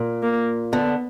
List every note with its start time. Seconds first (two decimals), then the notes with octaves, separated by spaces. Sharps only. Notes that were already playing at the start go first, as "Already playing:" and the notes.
Already playing: A#2
0.23 A#3
0.73 D3 B3